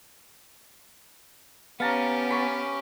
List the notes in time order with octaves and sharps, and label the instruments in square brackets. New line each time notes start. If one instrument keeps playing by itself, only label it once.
[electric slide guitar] B3 [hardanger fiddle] C#4 G4 [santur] F5 A5 A#5
[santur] G#5 B5 C#6